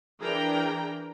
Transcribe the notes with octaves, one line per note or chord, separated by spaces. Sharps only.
E3 D4 G#4 A#4 G5 A#5